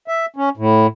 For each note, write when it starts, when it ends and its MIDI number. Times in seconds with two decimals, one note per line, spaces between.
0.08 0.26 76
0.36 0.49 61
0.57 0.87 45